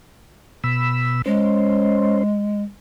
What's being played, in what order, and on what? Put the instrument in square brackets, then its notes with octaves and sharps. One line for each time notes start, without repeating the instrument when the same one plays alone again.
[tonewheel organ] B2 B5 E6
[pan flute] G#3 [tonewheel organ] C#4 C5